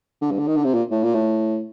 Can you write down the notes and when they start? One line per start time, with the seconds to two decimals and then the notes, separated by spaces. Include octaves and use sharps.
0.21 D3
0.31 G2
0.38 D3
0.47 D#3
0.56 D3
0.64 C3
0.74 A#2
0.91 A2
1.03 A#2
1.14 A2